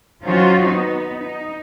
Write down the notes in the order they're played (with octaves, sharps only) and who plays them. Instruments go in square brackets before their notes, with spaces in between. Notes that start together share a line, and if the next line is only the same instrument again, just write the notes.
[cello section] D#3 F#3 C#4 F4 F#4 C5
B3 D#4
D#4